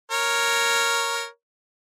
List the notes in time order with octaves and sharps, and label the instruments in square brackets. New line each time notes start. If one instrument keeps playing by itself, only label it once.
[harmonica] A#4 C#5